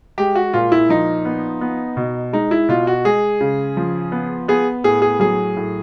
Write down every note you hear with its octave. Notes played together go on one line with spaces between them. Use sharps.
G#3 G4
F#4
A#2 F4
E4
F3 D#4
B3
B3
B2
G#3 D#4
E4
B2 F4
F#4
G#3 G#4
C#3
F3
B3
B3 G#4
A2 G#4
G#4
F#3 G#4
A2